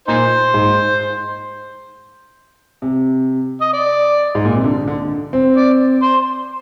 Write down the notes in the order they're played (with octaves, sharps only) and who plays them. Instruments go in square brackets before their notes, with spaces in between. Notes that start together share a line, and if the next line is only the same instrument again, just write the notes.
[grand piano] A#2 [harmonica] D#4 C5
[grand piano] G#2
C3
[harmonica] D#5
D5
[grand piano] G#2
A#2
C3
D3
D3
C4
[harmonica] D5
C5